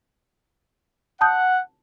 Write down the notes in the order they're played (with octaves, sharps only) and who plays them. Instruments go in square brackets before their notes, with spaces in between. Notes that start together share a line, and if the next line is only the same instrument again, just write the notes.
[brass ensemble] F#5 [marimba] A5 D#6 G6